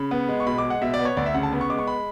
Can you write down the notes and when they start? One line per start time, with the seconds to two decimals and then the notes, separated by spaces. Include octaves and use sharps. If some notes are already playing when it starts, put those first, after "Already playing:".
Already playing: C#3 B5
0.11 B3
0.29 G#3
0.40 C#6
0.46 B2 B5
0.58 D6
0.64 G#3
0.70 F#5
0.82 B2 E5
0.94 D5
0.99 B3
1.05 C#5
1.17 D2 D5
1.26 E5
1.34 C#3 F#5
1.43 A5
1.52 B3
1.61 C#6
1.70 G#3 D6
1.78 C#6
1.87 B5